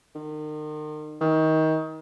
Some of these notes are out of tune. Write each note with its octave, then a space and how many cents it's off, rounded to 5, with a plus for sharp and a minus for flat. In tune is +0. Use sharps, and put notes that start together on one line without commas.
D#3 -35
D#3 +25